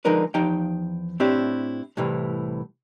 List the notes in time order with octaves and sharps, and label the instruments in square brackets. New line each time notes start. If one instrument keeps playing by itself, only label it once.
[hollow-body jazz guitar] D3 F3 G#3 D#4 A#4 B4
E2 F3 D#4 G4 F5 G5
A2 C4 D4 E4 G4
C2 A2 C3 E3